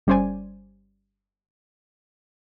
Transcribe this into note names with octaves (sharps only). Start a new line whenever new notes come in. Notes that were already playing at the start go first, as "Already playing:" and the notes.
G1 G3 C#4 C5 D5 G#5